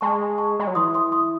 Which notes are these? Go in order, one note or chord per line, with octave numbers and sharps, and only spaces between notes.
G#3 A5 C#6
A5 C#6
G#3
F#3
E3 C6 D#6
C6 D#6
C6 D#6